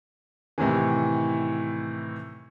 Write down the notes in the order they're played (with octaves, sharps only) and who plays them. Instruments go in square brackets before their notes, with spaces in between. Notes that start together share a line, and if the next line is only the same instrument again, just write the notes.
[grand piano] A2 C3 D#3 E3